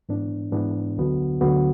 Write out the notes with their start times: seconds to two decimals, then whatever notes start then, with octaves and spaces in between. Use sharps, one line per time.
0.09 G#2 E3 B3 D4
0.52 G#2 E3 B3 D4
0.97 D2 D3 F#3 B3 F#4
1.41 D2 D3 F#3 B3 F#4